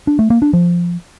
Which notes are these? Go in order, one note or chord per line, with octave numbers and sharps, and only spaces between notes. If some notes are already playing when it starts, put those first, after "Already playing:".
D4
A3
A#3
D4
F3